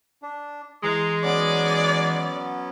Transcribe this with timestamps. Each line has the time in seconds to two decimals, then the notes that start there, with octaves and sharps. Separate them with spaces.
0.22 D4
0.83 E3 G#3 A#5 C6
1.24 F#3 B3 C#4 D5